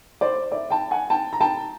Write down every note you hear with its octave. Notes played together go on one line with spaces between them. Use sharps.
C5 D5
D5 E5
G5 A5
F#5 G#5
G5 A5
A#5
G5 A5